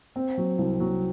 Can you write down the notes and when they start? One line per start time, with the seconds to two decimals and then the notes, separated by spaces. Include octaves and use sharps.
0.16 C4
0.38 F#3
0.59 C2
0.80 F#3